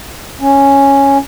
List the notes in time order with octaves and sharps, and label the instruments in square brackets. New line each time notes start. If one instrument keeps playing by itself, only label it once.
[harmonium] C#4